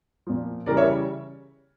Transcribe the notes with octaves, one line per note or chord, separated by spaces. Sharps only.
A#2 F3
C#3 E3 G3 A#4 D5
C#5 E5